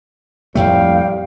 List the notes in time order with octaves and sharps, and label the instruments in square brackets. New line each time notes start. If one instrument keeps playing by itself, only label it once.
[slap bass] F2 A2 A3 [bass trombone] G3 [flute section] F5 G5